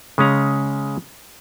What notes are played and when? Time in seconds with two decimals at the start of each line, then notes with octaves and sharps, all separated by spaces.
0.18 C#3 G#3 C#4 A#5